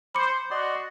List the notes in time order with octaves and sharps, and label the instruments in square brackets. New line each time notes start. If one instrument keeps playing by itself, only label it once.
[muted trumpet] C5 [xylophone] B5 D6 C#7
[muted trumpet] F#4 [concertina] D5 D#5 C6